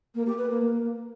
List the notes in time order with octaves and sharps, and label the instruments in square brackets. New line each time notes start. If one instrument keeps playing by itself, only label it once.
[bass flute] A#3
G4
B4
A#3
A#3